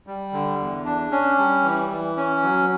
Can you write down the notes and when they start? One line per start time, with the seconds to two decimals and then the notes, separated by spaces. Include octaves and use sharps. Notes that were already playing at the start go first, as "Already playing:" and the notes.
0.07 G3
0.33 D3
0.59 E2
0.85 D4
1.12 C#4
1.38 G3
1.64 E3
1.90 E3
2.17 C#4
2.43 F#3